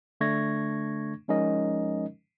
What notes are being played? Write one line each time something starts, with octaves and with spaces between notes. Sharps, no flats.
D3 A3 D4 C#6 G#6 A#6
F3 G#3 C#4 D#4 A#4 D#5